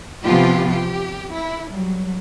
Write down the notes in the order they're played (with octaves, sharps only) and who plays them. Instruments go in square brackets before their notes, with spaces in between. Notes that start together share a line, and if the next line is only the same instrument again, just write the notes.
[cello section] C3 E3 F3 B3 F4 G4
G4
E4
F#3 G3